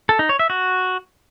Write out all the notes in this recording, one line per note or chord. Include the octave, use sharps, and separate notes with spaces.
A4
D#4
C#5
E5
F#4